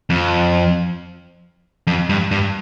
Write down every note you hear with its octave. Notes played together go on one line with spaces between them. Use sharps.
F2
F2
G2
G2